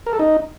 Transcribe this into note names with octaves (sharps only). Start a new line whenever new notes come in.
A#4
A4
D#4